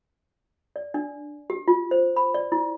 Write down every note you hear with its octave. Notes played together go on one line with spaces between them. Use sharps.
D5
D4
G4
F4
C5
B5
D5
E4